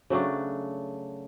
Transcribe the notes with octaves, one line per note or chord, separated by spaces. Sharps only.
C#3 F#3 A3 D4